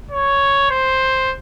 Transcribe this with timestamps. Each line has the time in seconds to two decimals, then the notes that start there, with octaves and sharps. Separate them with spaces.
0.11 C#5
0.70 C5